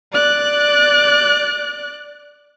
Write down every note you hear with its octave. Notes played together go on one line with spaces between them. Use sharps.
D5 F#6